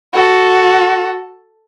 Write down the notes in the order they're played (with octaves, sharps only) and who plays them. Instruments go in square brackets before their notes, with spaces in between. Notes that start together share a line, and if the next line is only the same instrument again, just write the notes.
[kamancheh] F#4 A4